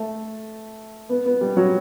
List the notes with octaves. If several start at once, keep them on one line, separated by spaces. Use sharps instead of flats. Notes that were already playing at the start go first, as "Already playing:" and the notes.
Already playing: A3
B3
B3
G3
F#3